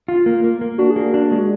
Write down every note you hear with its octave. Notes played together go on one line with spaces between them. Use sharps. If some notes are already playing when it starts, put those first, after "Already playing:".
F4
A#3
A#3
A#3
D4 F#4
G#4
A#3
F#4
D4
G#3
F#4